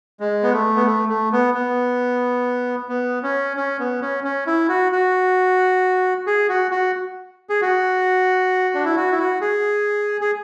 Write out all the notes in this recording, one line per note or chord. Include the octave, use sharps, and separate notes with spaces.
G#3
B3
A3
B3
A3
A3
B3
B3
B3
C#4
C#4
B3
C#4
C#4
E4
F#4
F#4
G#4
F#4
F#4
G#4
F#4
D4
E4
F#4
E4
F#4
G#4
G#4